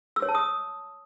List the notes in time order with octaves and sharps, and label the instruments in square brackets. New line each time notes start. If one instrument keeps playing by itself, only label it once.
[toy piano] E6
C#5
A5
D#6